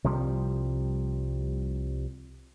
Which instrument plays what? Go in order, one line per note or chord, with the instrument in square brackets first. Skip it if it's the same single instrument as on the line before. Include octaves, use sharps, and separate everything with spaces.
[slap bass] C2 C3 F3 G3